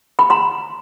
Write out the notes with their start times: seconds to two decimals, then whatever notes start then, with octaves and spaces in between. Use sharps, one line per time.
0.19 B5
0.30 A#5 C6